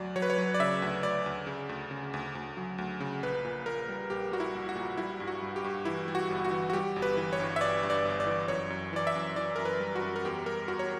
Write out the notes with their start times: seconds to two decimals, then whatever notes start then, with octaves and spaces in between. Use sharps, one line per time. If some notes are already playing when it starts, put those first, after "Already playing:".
Already playing: D2 F#3 D5
0.16 F#3 C#5
0.22 B4
0.30 C#5
0.38 F#3
0.54 D5
0.60 C#3 E5
0.82 D2
1.03 D2 D5
1.26 D2
1.47 C#3
1.69 D2
1.91 C#3
2.14 D2
2.35 D2
2.57 F#3
2.78 D2
3.00 C#3
3.23 A#1 B4
3.44 A#2
3.66 A#2 A#4
3.89 G3
4.10 A#1 G4
4.32 G3 F#4
4.40 E4
4.55 A#1
4.69 F#4
4.76 A#2
4.97 G3 E4
5.20 G2
5.28 F#4
5.42 G2
5.56 G4
5.64 G2
5.85 E3 E4
6.08 G3
6.15 F#4
6.30 G1
6.45 F#4
6.51 E3
6.70 F#4
6.73 G3 G4
6.96 G1
7.02 B4
7.17 E3
7.33 C#5
7.40 G2
7.56 E5
7.61 G1 D5
7.83 G2
7.90 D5
8.05 G1
8.20 D5
8.26 E3
8.48 F#2 C#5
8.70 F#2
8.93 E3 D5
9.07 E5
9.15 F#2
9.36 E3 D5
9.56 F#2 A#4
9.65 B4
9.80 G3
9.96 F#4
10.02 F#2
10.16 A#4
10.25 E2 G4
10.46 G3 A#4
10.68 E2 F#4
10.79 C#5